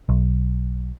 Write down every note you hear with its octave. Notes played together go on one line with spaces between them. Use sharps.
B1